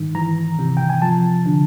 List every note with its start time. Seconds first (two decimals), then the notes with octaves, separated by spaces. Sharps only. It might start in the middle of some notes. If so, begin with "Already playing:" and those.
Already playing: G#2 D#3
0.15 E3 A#5
0.59 C3
0.77 G5
0.89 G#5
1.02 F3 A5
1.46 D3